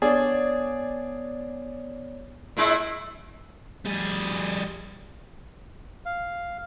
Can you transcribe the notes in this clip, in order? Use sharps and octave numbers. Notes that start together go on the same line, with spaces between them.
B3 D4 G#4 C#5 D5
A#2 G#3 E4
G3 G#4
F5